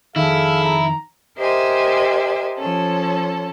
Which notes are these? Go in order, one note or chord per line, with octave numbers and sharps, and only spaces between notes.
F2 D#3 E4 G#4 A4 F5
A#5
G4 A#4 C5 D#5 E5 G#5
F3 C#4 A4